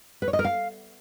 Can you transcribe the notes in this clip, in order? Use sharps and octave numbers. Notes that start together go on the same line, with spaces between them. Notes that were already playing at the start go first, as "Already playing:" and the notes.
B4
C#5
D#5
A#4
F5